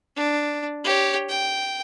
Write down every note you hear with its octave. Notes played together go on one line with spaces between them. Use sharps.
D4
G4 C#5
G5